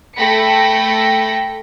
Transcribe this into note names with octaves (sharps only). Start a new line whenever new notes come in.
A3 A4 G5 B5 A#6 C#7